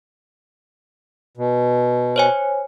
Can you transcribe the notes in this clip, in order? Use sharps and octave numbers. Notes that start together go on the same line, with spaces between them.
B2
C5 C#5 G#5